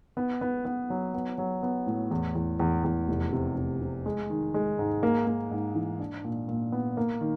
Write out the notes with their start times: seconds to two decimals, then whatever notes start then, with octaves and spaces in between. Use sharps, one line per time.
0.17 B3
0.41 B3
0.65 B3
0.90 F#3
1.14 B3
1.38 F#3
1.63 B3
1.87 A2
2.11 E2
2.35 E2
2.60 E2
2.84 E2
3.08 F1
3.33 C3
3.56 C3
3.82 C3
4.06 G#3
4.30 D#3
4.54 G#3
4.79 G#2
5.03 A#3
5.27 A#3
5.51 G#2
5.75 E3
6.00 D4
6.24 A#2
6.48 A#2
6.72 B3
6.97 A#3
7.21 D#3